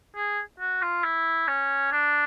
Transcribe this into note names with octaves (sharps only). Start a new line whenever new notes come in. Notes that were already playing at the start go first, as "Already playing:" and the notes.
G#4
F#4
F4
E4
C#4
D4